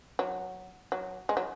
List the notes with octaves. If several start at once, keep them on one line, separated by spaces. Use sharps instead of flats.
F#3
F#3
G#3
F#3